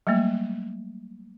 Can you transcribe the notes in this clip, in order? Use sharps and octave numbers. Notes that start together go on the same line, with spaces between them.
F#3 G3 A3 A#3